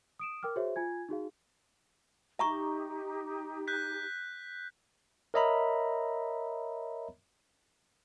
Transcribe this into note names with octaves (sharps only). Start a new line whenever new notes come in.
D#6 D7 E7
A#4 G5 D6 F6
F#4 G#4 C5 C#5 E5
F4 G#5 G#6
D#4 F#4 G#4 F5
D#4 G4 E5 A#5 C#6
F#6 G6 B6
A#4 C#5 D#5 E5 A#5 B5